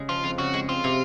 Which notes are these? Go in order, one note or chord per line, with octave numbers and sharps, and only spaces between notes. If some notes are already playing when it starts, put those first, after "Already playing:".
Already playing: C#3 G#3
F3 F4
F2
C#3 F#4
G#3
C4 F4
C3